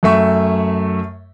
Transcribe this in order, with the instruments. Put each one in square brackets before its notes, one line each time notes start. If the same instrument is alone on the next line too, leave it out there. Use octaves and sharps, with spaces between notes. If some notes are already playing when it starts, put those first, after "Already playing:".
[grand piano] F#2 A3 E5 C#6